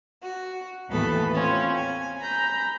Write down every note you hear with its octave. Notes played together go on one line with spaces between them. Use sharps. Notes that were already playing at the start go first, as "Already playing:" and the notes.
F#4
D#2 A2 E3 B3 A4 B5
C4 C#4 F4
G#5
A#5 B5 G6